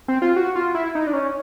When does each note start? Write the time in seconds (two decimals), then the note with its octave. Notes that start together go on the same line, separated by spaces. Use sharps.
0.08 C4
0.22 F4
0.36 F#4
0.56 F4
0.75 E4
0.95 D#4
1.07 D4
1.13 C#4